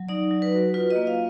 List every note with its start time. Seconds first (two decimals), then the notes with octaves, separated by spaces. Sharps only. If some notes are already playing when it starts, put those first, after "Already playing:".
Already playing: F#3
0.08 D#4 D5
0.31 F#3
0.42 B4
0.53 F#4
0.74 F4 B4
0.90 D#5
0.96 A#3
1.07 F5